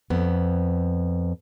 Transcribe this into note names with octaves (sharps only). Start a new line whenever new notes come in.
F2 B3